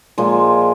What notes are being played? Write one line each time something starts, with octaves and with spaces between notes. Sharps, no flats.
A#2 F3 G#3